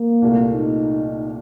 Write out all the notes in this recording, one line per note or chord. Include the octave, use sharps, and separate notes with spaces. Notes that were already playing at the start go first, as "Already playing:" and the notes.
Already playing: A#3
C2 A#2 A3
D#4